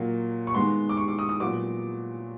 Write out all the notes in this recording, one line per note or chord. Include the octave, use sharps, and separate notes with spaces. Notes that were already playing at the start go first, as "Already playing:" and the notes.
Already playing: A#2 F#3 A#3
C#6
D#3 G#3 B3 C6
D6
C#6
D6
D#6
D#6
A#2 F#3 B3 D6